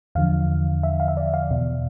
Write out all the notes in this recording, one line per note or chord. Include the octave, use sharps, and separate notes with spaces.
E2 D3 F3 F5
E5
F5
E5
D5
F5
E2 B2